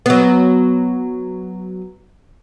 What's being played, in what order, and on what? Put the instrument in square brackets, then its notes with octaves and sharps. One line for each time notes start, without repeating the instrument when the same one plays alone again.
[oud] F#3 B3